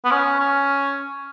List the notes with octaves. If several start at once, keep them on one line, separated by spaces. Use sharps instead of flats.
B3
C#4
C#4